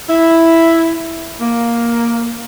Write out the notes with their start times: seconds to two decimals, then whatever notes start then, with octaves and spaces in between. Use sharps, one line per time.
0.08 E4
1.40 A#3